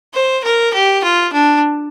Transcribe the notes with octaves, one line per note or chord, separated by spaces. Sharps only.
C5
A#4
G4
F4
D4